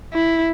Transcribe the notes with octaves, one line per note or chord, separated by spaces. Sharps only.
E4